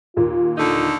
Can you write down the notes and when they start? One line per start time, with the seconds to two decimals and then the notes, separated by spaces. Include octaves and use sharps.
0.16 D#2 A#2 A#3 F4
0.57 D3 A3 D#4